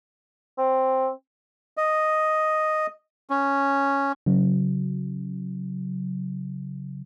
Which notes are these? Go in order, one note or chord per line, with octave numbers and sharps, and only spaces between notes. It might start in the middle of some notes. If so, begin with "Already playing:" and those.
C4
D#5
C#4
C#3 F#3